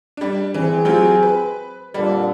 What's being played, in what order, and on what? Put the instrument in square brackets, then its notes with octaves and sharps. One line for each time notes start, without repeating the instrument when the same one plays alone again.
[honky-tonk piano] G3 D4
[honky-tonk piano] E3 [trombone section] C4 G#4
[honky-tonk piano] F#3 F4 G4
B4
[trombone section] F2 A#2 D3 [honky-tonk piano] G3